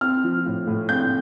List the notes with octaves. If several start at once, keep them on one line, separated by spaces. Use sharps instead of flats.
C4 F6
F3
A2
A2
C4 G6